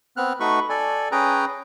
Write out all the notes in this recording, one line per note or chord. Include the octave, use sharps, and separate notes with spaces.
B3 C4 F6 F#6
A3 D#4 F#4 B4 B5 C#6
A4 D5 G#5
C#4 G#4 B4 G5 A#5